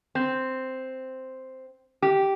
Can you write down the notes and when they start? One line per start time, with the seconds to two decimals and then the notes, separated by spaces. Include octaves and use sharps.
0.15 C4
2.02 G4